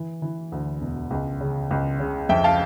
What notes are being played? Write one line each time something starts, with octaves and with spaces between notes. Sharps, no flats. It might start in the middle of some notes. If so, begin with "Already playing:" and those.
Already playing: E3
E3
D2
E1
C#2
C#3
C#2
C#3
F2 E5 G5
F5 A5